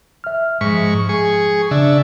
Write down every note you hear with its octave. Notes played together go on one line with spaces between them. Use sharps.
E5 F6
G#2 F3 C#6 B6
G#4 C#6
C#3 D4 E5